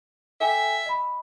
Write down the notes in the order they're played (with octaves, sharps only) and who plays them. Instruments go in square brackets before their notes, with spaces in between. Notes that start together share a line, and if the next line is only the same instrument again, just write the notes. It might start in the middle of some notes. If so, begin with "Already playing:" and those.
[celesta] A4 G5 G#5 [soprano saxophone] E5
[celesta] D#5 B5